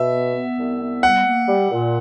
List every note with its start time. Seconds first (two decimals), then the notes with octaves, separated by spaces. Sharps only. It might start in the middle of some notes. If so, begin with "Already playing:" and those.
Already playing: B2 E5
0.12 B3
0.35 B3
0.58 C2
0.80 B3
1.03 G3 F#5
1.25 A#3
1.48 G3
1.71 A#2